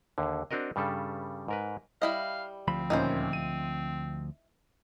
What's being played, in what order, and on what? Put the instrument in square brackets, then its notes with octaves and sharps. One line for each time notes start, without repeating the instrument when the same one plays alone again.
[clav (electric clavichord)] D#2 D3
C4 D4 F#4 A#4 D#5
G2 C#3 G3 A4
G#2 A#4 B4
[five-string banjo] G3 E4 D#5 [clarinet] F5
[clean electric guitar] D2 F3 B5 [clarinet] C4
[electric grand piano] D#2 A#2 C#4 [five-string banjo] D#4 E4 C5
[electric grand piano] D#7